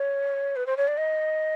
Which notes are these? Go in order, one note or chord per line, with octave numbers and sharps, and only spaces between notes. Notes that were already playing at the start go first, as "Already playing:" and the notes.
Already playing: C#5
B4
C5
C#5
D5
D#5